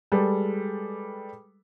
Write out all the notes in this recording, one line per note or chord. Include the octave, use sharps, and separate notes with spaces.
G3 G#3 A4 B4